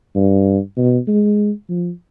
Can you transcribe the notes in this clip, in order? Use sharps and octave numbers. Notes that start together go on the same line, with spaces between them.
G2
B2
G#3
F3